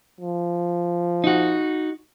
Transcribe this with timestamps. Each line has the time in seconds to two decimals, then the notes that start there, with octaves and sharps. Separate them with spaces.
0.21 F3
1.24 D#4 F#4